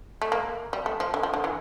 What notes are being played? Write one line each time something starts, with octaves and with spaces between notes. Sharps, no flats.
A3
A#3
G3
A3
F3
D3
F3
D3
E3